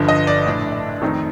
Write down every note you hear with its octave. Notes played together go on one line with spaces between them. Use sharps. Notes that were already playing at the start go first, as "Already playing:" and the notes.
Already playing: G1 G2 D3 F3
D#5
D5
A#1 A2 A3 D4
F2 D#3 A3 C4 D#4